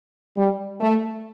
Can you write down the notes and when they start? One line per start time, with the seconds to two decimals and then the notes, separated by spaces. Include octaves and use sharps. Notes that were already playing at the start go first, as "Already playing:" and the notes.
0.35 G3
0.80 A3